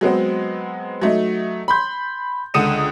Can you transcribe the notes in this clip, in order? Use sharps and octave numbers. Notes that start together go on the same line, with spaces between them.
F#3 G#3 B3 C4
F#3 A3 D#4
B5 C6 G6
C#2 D3 D#6 C#7 D#7 E7